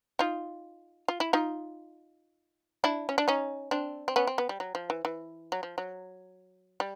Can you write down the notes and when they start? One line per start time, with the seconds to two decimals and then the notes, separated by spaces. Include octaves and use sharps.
0.19 D#4 F4
1.08 F4
1.20 E4
1.33 D#4 F4
2.84 D4 E4
3.09 C#4
3.18 D4
3.28 C#4 D#4
3.71 C4 D4
4.08 C4
4.16 B3 C#4
4.27 C4
4.38 B3
4.49 G3
4.60 F#3
4.75 F3
4.90 E3
5.05 E3
5.52 F#3
5.63 F3
5.78 F#3
6.80 G3